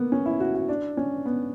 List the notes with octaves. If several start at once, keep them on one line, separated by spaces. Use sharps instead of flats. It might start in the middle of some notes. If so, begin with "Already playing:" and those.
Already playing: A#3 B3
C#4
E4
F#4
F#4
D4
C#4
B3